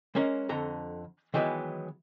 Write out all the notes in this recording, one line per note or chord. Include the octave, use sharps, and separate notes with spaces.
G#3 A#3 C#4 A#4
F2 D3 A#5
D#3 E3 F#3 G#3 B3